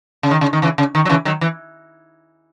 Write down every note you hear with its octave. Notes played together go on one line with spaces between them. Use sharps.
C#3
D#3
C#3
D#3
C#3 E3
C#3
D#3
F#3
C#3 E3
D#3 F#3
E3